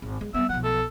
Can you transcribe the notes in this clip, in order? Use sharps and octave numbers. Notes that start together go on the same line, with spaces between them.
G#1
G#3
G3 B3 E5
B1 F3 F#5
A4